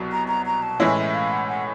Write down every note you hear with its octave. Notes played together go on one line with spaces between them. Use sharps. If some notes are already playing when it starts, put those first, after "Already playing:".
Already playing: C2 B2 F#3
A#5
A#5
A#5
A5
A2 E3 G#3 C#4 E4 E5
E5
F5
F#5
F#5